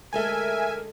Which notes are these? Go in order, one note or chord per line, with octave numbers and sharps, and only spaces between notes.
D2 G#3 A4 A#4 E5 G#5